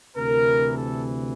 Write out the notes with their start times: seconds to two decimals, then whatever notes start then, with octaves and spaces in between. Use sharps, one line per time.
0.15 D2 C3 E3 A#4
0.76 A4